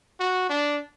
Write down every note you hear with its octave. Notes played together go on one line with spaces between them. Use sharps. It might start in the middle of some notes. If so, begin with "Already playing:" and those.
F#4
D4